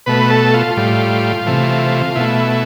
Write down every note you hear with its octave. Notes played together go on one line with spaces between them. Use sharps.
B2 A3 B4
A4
F4
A2 G3
C3 E3 A3
B2 A3 E4